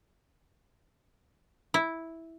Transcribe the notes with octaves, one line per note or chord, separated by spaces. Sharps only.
E4